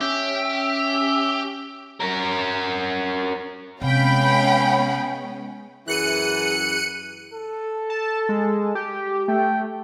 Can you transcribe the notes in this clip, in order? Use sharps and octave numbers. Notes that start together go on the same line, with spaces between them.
C#4 G4 E5
C#4 A#4
C3 G#3 B3 C#4 F5 G5 B5
F#2 E3 G#4 F#6 C#7 D#7
A4
A5
G#3
G4
A3 G5